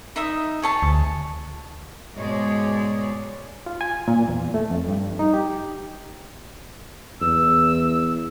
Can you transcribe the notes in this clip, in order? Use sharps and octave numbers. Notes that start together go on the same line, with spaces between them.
D#4 E5 D#6
G#4 C#5 A5
D2
G#2 B2 G#3 G#4 C#5 D5
F4
G#5
A#2
E2
A3
F2
G2
D#4
G4
E2 E6